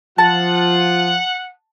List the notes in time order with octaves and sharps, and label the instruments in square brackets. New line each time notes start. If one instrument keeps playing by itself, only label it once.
[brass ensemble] F3 F4 [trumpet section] F#5 [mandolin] A5